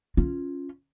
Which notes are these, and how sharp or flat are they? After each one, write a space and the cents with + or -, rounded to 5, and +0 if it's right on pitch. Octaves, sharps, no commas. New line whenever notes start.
C#4 +0 F4 +0